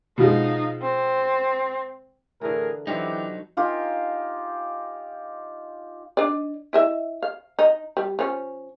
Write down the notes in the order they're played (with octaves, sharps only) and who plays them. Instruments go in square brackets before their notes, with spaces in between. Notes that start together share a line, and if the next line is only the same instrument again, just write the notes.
[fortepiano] B2 F3 G#3 [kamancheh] D#4 F5
[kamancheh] C4
[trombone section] A2 G#4 A#4 [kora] D3 E3
[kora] D3 C4 F5 [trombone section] E3 G4 [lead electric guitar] F#3 D#4
[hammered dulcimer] D#4 F4 G4 G#5
[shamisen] D4 D#4 D5
E4 D#5 E5
F5
D#4
G3
F3 C#4